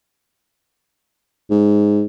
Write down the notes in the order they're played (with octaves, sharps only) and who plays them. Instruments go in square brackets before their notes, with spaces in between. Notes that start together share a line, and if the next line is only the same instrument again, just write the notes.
[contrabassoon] G#2